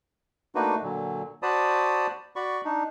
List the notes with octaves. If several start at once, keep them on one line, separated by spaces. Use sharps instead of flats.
A3 A#3 D4 D#4 F#4 B4
A#2 D3 F#3
F#4 C5 D5 A5 B5 D#6
F#4 D5 B5 C#6
D4 D#4